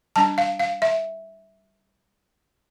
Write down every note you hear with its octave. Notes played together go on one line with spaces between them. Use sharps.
G3 D4 A5
F5
F5
E5